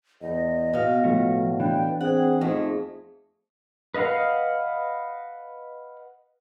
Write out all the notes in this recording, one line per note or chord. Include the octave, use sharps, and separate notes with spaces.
E2 D#5
B2 F5
A2 F3 A3 F#4
E3 D4 G5
C4 G#4 F#5
F2 A3 D#4
B4 D#5 F5 F#5